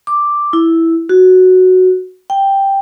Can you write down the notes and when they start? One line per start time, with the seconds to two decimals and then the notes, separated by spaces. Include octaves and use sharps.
0.07 D6
0.53 E4
1.09 F#4
2.30 G5